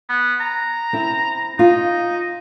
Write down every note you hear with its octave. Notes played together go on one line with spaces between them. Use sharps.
B3
A#5
C4 E4
D#4 F4